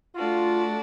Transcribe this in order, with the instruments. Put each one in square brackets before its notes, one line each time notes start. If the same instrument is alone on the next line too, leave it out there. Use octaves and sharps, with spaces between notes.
[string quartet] A3 D4 F#4 [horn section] F4